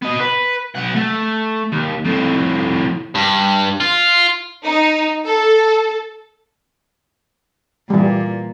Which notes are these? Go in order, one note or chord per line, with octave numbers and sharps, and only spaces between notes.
B3 D#5
B4
B1 F#5
A3
D#2
F2 A2
G2
F4
D#4
A4
A#2 E3 G3